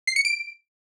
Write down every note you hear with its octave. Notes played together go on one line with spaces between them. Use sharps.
C7
C#7
D7